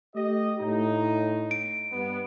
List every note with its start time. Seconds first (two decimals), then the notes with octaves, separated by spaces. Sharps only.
0.15 A3 G4 D#5
0.60 A2 D#4
1.51 D7
1.92 G2 B3